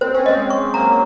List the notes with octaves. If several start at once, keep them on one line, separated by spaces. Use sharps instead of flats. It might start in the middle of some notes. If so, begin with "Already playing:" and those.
C4 C5
C#4
G#3 C4 D#5
C#6
F#3 A#3 A#5